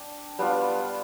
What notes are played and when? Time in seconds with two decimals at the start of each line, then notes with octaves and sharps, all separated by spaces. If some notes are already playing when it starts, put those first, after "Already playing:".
Already playing: D4 G5
0.39 G3 B3 D4 F4